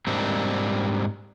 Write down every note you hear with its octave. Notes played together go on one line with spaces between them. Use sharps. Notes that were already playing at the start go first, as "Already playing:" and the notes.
G#2 G3 A#3 C4 D4